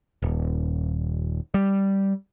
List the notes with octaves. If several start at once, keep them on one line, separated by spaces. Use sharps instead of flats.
D#1
G3